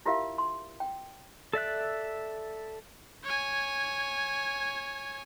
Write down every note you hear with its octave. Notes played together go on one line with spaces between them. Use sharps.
E4 F4 G4 A#4 E5 F5
C6
G5
A4 D5 E5 F#6
C#5 G#5